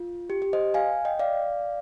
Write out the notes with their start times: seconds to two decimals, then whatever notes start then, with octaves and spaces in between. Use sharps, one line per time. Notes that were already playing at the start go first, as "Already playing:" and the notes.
Already playing: F4
0.30 G4
0.42 G4
0.53 C5 D#5
0.74 F5 G#5
1.05 D#5 G5
1.20 D5 F5